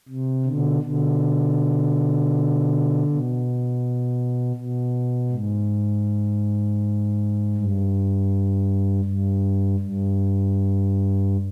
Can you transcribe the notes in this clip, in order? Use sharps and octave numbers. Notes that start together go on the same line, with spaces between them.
C3
B2 D3
B2 D3
B2
B2
G#2
G2
G2
G2